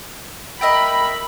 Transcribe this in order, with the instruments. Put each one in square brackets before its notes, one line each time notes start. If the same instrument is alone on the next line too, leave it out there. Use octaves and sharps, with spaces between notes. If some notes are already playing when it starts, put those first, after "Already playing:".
[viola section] A#4 B5 [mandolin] D#5 E5 G5